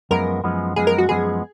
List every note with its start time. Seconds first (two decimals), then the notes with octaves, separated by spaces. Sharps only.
0.11 F#2 F3 G#3 B3 A#4
0.44 F#2 F3 G#3 B3
0.76 F#2 F3 G#3 B3 G#4
0.87 A#4
0.98 F#4
1.09 F#2 F3 G#3 B3 G#4